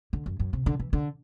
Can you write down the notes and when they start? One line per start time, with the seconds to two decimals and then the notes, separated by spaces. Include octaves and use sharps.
0.13 D3
0.26 F#2
0.39 F#2
0.53 C3
0.66 D3
0.80 E3
0.93 D3